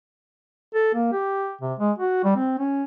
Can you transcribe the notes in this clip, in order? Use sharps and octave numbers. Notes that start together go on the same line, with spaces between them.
A4
A#3
G4
C3
G#3
F#4
G3
C4
C#4